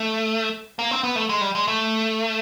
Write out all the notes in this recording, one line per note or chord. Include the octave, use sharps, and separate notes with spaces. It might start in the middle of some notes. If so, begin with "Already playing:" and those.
Already playing: A3
A#3
C4
B3
A3
G#3
G3
G#3
A3